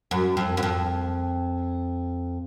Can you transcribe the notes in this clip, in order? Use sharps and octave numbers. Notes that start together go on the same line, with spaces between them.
F#2
F2
F#2
F2